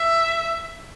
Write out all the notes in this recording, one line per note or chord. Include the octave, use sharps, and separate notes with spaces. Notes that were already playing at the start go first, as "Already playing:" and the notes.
Already playing: E5